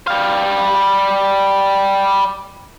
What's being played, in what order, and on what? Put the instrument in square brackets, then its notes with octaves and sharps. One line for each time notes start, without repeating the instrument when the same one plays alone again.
[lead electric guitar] G3 F5